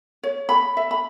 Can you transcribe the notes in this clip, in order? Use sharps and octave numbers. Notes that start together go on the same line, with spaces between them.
C#5
B5
E5
B5